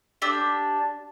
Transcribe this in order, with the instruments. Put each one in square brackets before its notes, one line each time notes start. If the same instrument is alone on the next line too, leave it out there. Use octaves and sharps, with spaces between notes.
[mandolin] D4 G4 E6